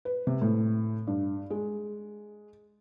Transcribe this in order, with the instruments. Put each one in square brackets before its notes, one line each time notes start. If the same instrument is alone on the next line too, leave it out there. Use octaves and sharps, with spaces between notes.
[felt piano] B4
C3
A2
G2
G#3